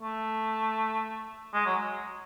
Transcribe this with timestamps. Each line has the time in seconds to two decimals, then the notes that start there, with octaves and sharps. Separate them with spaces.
0.02 A3
1.53 G#3
1.66 F#3